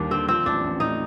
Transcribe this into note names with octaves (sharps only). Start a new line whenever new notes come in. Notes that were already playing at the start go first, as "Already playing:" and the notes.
Already playing: D#2 G3 A#3 D4
D3 C4
F3 C4
A1 D4
A1
A2 D#4